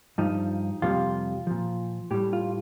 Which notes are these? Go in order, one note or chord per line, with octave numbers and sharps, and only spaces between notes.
G2 F3 D#4
F2 C3 G3 F4
A#2 F3
A2 G3 G4
F4